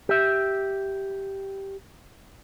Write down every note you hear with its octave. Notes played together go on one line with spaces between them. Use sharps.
G4 E5